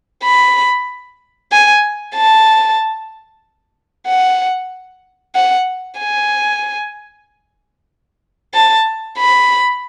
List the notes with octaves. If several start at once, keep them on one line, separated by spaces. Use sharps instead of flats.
B5
G#5
A5
F#5
F#5
G#5
A5
B5